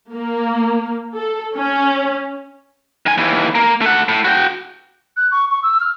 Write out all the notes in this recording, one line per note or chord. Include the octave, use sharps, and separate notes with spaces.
A#3
A4
C#4
D#3 G#5
D#2 E3
A#3
A3 F#5
A2
F#4 G5
F#6
C#6
C#6
E6
F6